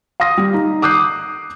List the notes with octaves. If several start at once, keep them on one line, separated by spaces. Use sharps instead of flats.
F5 C6 D#6 A#6
G3
D#4
D6 D#6 F#6 G6 C7